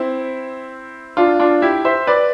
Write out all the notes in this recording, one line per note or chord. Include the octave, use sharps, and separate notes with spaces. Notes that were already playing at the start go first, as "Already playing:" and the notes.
Already playing: C4 E4
D4 F4
D4 F4
E4 G4
C5 E5
B4 D5